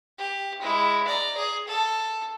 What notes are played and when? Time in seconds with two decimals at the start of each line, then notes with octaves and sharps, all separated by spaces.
0.18 G4
0.61 G#3 E4
1.07 D5 A#5
1.37 G#4
1.68 A4